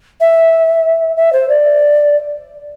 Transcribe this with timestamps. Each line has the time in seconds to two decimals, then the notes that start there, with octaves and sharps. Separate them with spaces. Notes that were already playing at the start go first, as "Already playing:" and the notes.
0.21 E5
1.17 E5
1.33 C5
1.49 D5